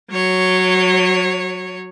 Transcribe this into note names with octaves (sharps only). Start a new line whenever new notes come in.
F#3 C#5